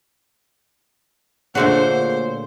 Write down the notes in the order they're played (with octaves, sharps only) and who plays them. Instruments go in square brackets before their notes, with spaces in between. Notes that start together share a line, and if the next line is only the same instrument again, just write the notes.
[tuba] A#2 [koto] D3 A3 F#4 [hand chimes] G#4 C#5 [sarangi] C5